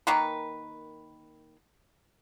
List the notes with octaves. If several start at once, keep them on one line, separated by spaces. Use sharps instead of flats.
D#3 A#3 B4